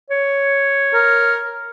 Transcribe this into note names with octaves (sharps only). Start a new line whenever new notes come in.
C#5
A#4